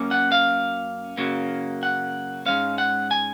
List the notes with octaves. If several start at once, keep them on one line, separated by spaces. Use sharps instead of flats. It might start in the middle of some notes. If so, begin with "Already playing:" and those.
Already playing: F#2 A#3 C#4
F#5
F5
F#2 C#3 F#3 A#3
F#5
G#2 F3 G#3 C#4 F5
F#5
G#5